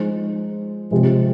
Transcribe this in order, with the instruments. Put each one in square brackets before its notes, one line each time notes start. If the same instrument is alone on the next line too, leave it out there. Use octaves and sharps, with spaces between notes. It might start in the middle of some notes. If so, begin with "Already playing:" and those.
Already playing: [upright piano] F3 G#3 D#4 C5
C3 F3 G#3